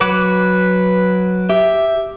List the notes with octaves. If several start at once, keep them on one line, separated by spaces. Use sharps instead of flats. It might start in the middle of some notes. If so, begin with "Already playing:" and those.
F#3 F#4 B4 D6
G4 E5